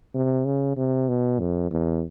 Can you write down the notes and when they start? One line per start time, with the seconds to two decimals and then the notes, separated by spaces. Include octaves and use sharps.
0.15 C3
0.46 C#3
0.77 C3
1.09 B2
1.40 F2
1.71 E2